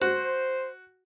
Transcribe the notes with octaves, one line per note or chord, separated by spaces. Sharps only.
F#4 C5